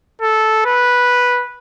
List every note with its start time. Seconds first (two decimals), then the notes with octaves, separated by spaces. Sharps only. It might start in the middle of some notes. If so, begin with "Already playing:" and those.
0.22 A4
0.66 B4